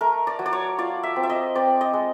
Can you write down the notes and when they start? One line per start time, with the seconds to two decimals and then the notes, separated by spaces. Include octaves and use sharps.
0.01 A3 A#4
0.27 D5
0.39 F#3
0.46 D5
0.53 C#5
0.78 F4 D5
1.03 E5
1.16 C4
1.23 E5
1.30 D#5
1.55 C4 D5
1.81 D#5
1.93 G#3